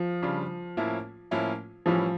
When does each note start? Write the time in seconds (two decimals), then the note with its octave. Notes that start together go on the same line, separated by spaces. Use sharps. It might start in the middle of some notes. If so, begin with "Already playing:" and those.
Already playing: F3
0.23 C#3 G3 D4 F4
0.77 A2 F3 A#3 C#4 E4
1.31 A2 F3 A#3 C#4 E4
1.86 A2 E3 F3 G3 C#4